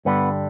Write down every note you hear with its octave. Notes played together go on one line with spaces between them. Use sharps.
G2 D3 G3 B3